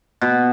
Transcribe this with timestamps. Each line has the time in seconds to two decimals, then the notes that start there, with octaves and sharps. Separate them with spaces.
0.21 B2